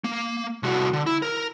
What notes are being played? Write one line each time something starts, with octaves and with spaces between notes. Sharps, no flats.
A#3
C2 F#4
D3
E4
A#4